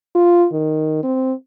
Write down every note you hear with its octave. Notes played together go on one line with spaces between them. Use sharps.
F4
D#3
C4